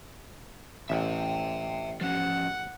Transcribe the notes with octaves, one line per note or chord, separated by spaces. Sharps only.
A1 E5 G5
F3 C#4 F#5